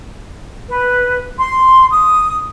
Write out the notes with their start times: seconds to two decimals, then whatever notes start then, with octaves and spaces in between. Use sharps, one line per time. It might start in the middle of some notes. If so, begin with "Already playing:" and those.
0.69 B4
1.38 C6
1.91 D#6